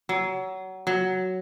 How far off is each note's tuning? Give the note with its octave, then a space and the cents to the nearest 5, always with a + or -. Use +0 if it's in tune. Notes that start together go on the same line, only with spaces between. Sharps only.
F#3 +25
F#3 +5